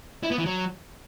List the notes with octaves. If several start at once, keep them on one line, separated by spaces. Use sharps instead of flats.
E4
B3
E3
F#3